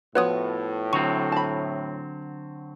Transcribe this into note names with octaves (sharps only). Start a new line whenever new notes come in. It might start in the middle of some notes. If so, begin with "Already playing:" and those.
A2 F3 B3 F#4 B4 C#5 D#6
D3 F#3 C4 C#6
A5 B5